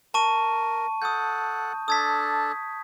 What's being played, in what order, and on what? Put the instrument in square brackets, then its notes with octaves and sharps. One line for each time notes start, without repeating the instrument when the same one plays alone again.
[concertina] A#4 [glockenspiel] A5 C#6 D#7
[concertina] A4 F#5 [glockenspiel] D#6 G6
[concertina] D4 A4 [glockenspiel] D#6 G#6 B6